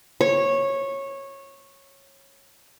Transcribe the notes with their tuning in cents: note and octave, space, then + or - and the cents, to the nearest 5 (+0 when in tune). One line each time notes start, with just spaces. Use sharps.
C#5 -15